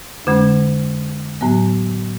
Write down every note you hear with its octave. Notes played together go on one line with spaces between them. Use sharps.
F2 D3 G#3 C#4
A2 F#3 B3